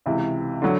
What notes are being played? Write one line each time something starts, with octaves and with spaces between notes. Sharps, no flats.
C#2 C3 E3
D3 F#3